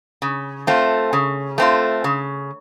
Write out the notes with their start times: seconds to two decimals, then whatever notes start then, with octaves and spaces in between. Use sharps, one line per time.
0.22 C#3
0.67 A3 C4 F4
1.13 C#3
1.58 A3 C4 F4
2.04 C#3